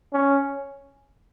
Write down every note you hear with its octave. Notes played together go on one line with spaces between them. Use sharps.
C#4